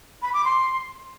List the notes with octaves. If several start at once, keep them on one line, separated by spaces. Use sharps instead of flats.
B5
D6
C6